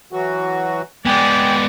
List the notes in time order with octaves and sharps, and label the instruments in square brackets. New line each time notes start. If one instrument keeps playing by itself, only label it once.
[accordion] E3 F#3 F#4
[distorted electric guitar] G#3 B3 [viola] D5 [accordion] G5 G#5